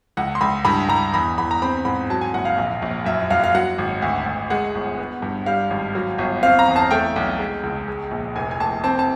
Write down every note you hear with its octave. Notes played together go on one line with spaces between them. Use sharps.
C#2 F#5
C6
C#2 B5
G2 B5
G2 A#5
E2 B5
E2 B5
A#5
C4 B5
G#2 B5
F#3 A5
G#5
F#1 F#5
F5
A#1
A#1
F#2 E5
F#2 F5
F5
F#3 F#5
G#1
D2
D2
G#3 F#5
G1
B3
G2
G3 F5
G#1
F#3
G1
C4 F5
A#5
E2
A5
A3 G5
B1
G#3
C#2
G#3
A#1
F1 G#5
G#5
F1 A5
C4 A5
A5